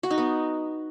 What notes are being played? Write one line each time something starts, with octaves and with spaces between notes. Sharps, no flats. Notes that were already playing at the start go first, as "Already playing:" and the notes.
F#4
D#4
B3